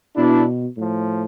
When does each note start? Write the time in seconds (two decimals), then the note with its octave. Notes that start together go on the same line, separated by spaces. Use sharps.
0.16 B2 D4 E4
0.76 A2 F3